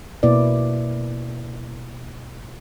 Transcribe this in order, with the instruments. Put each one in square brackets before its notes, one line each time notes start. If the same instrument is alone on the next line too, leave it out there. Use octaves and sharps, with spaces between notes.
[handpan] B2 A#3 E4 B4 D5